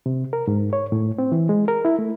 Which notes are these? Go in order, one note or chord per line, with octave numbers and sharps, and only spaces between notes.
C3
A#4
G#2
C#5
A2
C4
E3
G#3
A#4
E4
A3